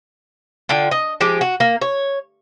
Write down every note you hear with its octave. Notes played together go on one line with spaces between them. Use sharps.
D3 F4 G5
D#5
F3 G#3 G4
F#4
A#3
C#5